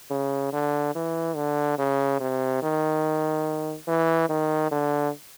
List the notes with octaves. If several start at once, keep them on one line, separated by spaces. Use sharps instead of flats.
C#3
D3
E3
D3
C#3
C3
D#3
E3
D#3
D3